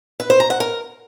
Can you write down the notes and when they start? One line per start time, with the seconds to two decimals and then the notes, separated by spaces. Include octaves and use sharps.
0.20 B4
0.30 C5
0.40 A#5
0.50 F#5
0.60 A#4